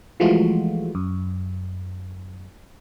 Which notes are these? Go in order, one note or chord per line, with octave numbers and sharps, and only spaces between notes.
E3 F3 G#3 A3 F4 F#4
F#2